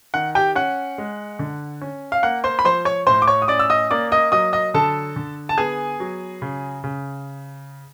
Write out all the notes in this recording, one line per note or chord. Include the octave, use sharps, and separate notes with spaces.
D#3 F#5
G4 G5
C#4 F#5
G#3
D3
C#4
F5
A#3 F#5
C5 C6
B5
F3 C5 C6
C#5 C#6
A2 C5 C6
D6
C#5 C#6
D#6
C#4 D5 D6
E6
D#5 D#6
A#3 D5 D6
D#5 D#6
F#3 D#5 D#6
D#5 D#6
D3 A4 A5
D3
A5
B3 G#4 G#5
F#3
C#3
C#3